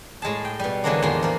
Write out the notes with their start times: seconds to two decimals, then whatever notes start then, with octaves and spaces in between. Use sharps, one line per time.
0.22 A2 G#3 G#4 A5
0.45 G5
0.60 B2 G3
0.84 D3 E3 F#3 G#3 A#3 D4
1.02 E2 A2 D#3 A#3 D4 C6
1.23 F3 A#3